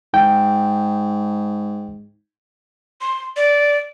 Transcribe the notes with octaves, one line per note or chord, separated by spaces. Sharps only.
G#2 G5
C6
D5